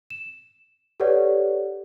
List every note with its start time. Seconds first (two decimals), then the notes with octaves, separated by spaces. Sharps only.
0.10 E7
1.00 G4 A4 B4 C#5 D5 F#5